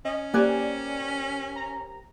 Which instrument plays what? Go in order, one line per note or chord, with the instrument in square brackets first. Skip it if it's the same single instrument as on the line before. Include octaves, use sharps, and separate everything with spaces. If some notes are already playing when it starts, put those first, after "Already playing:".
[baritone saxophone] C#4 [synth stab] D#5
[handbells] A#3 F#6 [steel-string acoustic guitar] G4 A#4 C5 [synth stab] D5 G#5
[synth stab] A#5